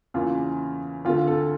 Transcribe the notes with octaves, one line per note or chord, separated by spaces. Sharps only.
E2 C#3 E3 A#3 F4
D2 D3 A3 F4
A4